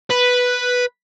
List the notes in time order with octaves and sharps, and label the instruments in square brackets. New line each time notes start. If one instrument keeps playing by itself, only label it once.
[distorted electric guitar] B4